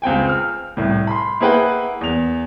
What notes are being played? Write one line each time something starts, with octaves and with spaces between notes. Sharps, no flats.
C#2 C4 G5 G#5
F6
C2 A2
B5 C6
A#3 E4 G#4 B4 F#5 G5
E2 F7